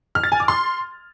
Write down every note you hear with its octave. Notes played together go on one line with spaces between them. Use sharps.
F6
A6
G#5
D6
C6